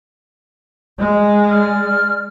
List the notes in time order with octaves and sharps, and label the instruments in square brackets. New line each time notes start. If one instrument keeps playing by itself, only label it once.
[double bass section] G#3
[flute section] D5 F6